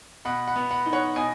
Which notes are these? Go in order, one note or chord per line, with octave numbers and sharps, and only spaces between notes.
B2 F#5 B5
F#5 B5
B3
F#5 B5
D#4
C#5 F#5
B2 D#5 G#5